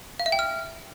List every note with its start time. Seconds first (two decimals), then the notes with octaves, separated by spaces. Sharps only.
0.20 F5
0.26 E5
0.32 G5
0.39 F6